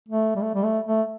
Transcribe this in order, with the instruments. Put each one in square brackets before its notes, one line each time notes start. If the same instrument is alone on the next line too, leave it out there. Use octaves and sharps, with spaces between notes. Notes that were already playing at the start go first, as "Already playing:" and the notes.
[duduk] A3
G3
A3
G3
A3
A3